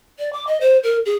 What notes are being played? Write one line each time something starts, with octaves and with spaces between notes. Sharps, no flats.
D5
D6
D#5
C5
A#4
G#4